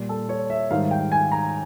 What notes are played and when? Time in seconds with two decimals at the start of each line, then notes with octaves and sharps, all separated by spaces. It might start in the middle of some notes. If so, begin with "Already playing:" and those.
Already playing: A#2 G3
0.09 A4
0.29 C#5
0.50 E5
0.71 G#2 D#3 G3 F5
0.91 G5
1.12 G#5
1.32 A#5